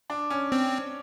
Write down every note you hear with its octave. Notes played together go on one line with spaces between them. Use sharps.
D4
C#4
C4